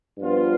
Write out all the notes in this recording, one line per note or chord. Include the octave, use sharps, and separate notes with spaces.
G2 F3 B3 F4